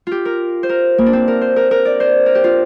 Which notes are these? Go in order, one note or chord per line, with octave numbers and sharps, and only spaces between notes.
F4 G4
A#4
C5
A#4
A#3
D4
C4
A#4
C5
A#4
A#4
D5
C5
A#4
G4
F4